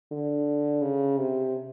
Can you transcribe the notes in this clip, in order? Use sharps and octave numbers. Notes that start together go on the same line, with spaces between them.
D3
C#3
C3